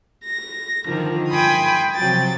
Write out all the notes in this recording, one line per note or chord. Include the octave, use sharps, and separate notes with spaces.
A#6
D3 D#3 F3
G5 G#5 B5 C6 D#6
C3 F3 F#3 G5 A6